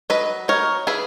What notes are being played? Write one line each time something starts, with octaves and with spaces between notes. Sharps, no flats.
F#3 B4 D#5
D#4 A#4 C#5
E3 G#4 B4